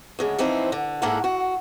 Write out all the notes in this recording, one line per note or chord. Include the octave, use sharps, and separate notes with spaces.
D2 C#3 G#3
E3 F3 C4 D#4 E4
D3
G#2 A#3 E4 A4 A#4 F#5
F#4